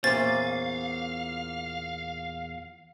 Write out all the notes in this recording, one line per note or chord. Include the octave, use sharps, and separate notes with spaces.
E2 A#2 C#4 C5 F5 A6